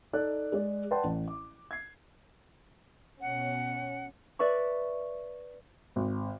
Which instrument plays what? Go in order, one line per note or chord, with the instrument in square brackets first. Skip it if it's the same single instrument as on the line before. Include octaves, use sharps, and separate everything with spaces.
[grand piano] D#4 A4 D5 F#6
G#3 D5
B4 D5 F#5 G5 A5 C6
A1
D6
G#6 C7
[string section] B2 C#4 [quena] F#5
[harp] B4 D5 E5 C#6
[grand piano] G#1